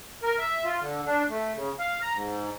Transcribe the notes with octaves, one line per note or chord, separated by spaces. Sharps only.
A#4
E5
F4
D3
D4
A3
C#3
F5
A#5
G#2